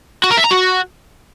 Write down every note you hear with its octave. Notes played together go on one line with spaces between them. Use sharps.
F#4
A#4
E5
A#5
F#4